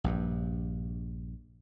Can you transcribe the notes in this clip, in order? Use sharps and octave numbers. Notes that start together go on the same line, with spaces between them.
A#1 G2